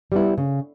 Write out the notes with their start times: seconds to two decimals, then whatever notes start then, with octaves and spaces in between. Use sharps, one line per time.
0.12 G3 B3 E4
0.38 C#3